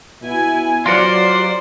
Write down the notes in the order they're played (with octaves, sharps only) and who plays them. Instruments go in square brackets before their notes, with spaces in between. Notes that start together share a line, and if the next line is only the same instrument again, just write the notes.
[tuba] B2 [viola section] E4 G#5
[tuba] F#3 [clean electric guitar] F4 A#4 F#5 [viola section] G4 D5 [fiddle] C5